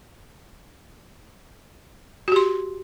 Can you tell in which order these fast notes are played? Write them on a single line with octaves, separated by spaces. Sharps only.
F#4 G4 C6